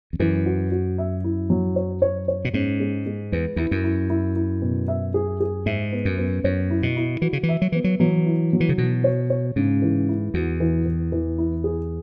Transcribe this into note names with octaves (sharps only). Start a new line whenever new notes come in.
E2
F#2 E3
F#4
F#4
E5
E4
F#3
C#5
C#5
C#5
B2
G#2 C#4
G#3
G#3
E2 B4
E2 E4
F#2
E4
E4
E4
B2
E5
G#4
G#4
G#2 E5
B3
F#2
B3
F#2 C#5
E4
B2
E4
E3 F#4
C#3
E3
E5
F#3
E3 B3
F#3
E3 F#3
E4
F#3
E3
C#3
B2 E3
C#5
C#5
G#2 C#3
E3
E4
E2 F#4
E3
E3
E3
E4
G#4